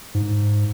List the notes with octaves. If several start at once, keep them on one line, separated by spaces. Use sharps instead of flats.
G#2